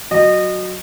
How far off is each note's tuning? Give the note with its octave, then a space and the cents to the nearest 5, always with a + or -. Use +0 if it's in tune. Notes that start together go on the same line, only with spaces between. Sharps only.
F#3 -10 D#5 -25